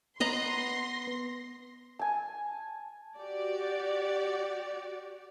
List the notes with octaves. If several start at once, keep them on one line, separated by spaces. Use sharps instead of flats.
B3 B4 D#5 A#5 C6 A#6
G#5 A5
F#4 G4 D5